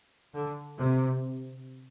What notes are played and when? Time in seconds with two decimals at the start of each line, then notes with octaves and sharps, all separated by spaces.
0.35 D3
0.78 C3